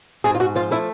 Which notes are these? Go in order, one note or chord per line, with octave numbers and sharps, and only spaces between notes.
G#2 G#4
F4
G#2 F#4
F3 F4
A3 E4